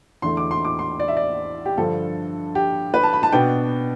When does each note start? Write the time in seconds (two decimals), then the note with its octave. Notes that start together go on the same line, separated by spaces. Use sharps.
0.22 E2 D3 A3 C6
0.37 D6
0.51 C6
0.65 D6
0.79 C6
1.00 D5
1.08 E5
1.17 D5
1.66 G4
1.77 G2 D3 F3 A4
2.55 G4
2.94 B4
3.03 A5
3.13 B5
3.23 A5
3.32 B2 B3 D4 G5